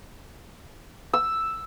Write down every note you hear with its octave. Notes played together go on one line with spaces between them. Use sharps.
E6